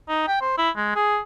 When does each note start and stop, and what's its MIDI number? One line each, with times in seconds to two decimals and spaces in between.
0.09 0.26 63
0.28 0.36 79
0.41 0.57 72
0.58 0.70 64
0.77 0.93 56
0.95 1.19 68